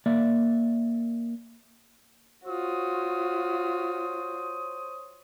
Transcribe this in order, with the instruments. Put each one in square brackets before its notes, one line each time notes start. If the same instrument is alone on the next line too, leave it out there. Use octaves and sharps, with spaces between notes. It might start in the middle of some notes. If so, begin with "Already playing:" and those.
[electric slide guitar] A#3 D5 E5
[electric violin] F4 F#4 [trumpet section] C5 C#5 D#6